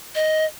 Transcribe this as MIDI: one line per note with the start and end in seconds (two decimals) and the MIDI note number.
0.15 0.45 75